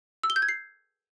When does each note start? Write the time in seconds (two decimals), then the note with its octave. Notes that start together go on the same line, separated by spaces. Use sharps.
0.23 E6
0.30 G7
0.36 G6
0.42 G#6
0.49 C7